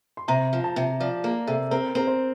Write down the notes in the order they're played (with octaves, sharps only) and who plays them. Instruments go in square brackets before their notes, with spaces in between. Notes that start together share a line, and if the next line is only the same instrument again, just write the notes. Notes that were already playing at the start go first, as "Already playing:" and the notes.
[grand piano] C6
[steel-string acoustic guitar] C3 [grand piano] A#5
[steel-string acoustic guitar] F3
[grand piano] A5
[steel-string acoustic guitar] C3
[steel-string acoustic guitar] F3 [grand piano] D5
[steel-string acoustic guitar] A#3 [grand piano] A#4
[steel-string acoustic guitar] C3 [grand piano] A4
[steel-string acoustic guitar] C4 [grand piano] A#4
[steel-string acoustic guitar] C4 [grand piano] A#4
[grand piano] C5